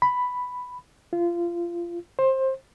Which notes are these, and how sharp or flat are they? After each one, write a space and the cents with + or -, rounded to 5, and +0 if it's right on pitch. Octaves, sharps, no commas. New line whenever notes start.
B5 +5
F4 -25
C5 +20